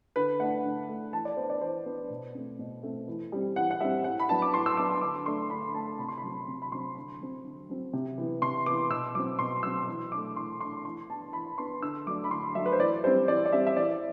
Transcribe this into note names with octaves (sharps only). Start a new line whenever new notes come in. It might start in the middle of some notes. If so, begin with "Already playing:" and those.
D3 B4
A3 D4 F#5
D3
A3 D4
E3 A5
D5
B3 D4 C5
D5
E3 C5
B3 D4
B2
A3 C4
B2
A3 C4
E3
G3 C4
E3 F#5
F#5
G3 C4 E5
A2 F#5
B5
F#3 B3 D4 A5
D6
A2 C6
E6
F#3 B3 D4 D6
D3 D6
A3 D4 C6
D3 B5
A3 D4 A5
C3 B5
C6
B5
F#3 C4
C3
B5
F#3 C4 C6
D3
F#3 C4
D3
F#3 C4
C3
E3 B3
C3 C6
E3 B3 D6
B2 E6
F#3 C4 D6
B2 C6
F#3 C4 E6
E3
A3 D4 D6
E3 C6
A3 D4 C6
E3 C6
B3 D4 A5
E3 B5
B3 D4 C6
D3 E6
F#3 A3 D4 D6
B5
D3 C6
F#3 A3 D4 E5
B4
C5
E3 D5
G3 C4 C5
E3 D5
D5
G3 C4 E5
E5
E3 D5